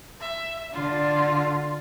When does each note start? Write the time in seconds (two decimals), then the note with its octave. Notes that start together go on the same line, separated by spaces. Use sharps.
0.20 E5
0.74 D3 F4